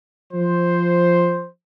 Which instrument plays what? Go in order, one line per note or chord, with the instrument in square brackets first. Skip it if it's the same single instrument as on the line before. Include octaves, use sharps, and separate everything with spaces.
[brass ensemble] F3 C5